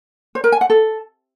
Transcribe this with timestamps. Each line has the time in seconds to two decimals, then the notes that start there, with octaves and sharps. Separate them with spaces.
0.35 C5
0.44 A#4
0.52 G#5
0.61 F#5
0.70 A4